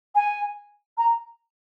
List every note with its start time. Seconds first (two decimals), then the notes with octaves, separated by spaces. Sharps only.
0.15 G#5
0.98 A#5